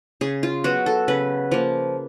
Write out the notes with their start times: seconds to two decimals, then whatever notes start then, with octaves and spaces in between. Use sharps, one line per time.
0.21 C#3 G#4
0.43 F4
0.64 F#3 B3 F#4
0.86 A4
1.08 C#3 B4
1.51 F3 A#3